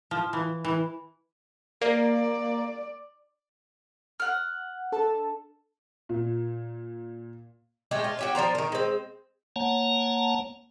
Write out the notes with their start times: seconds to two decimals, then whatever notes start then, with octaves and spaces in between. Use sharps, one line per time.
0.11 F3
0.33 E3
0.65 E3
1.81 A#3 D5
4.20 F#5 F6
4.92 D4 A4 A5
6.09 A#2
7.91 G#3 A3 G4
8.04 F4
8.19 F#4 G4 C#5
8.35 F3 D4 C5 A#5
8.55 D#3 A#4
8.72 G#3 C4
9.56 A#3 C#5 F#5 A5 A#5